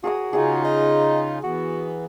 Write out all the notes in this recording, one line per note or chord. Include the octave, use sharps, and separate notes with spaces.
F#4 G#4 A#4 D#6
C#3 D#4 F4 G#4 F#5 G#5
D#5
E3 B3 F#4